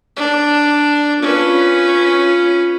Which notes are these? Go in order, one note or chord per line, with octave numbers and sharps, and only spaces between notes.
D4
C#4 F4 B4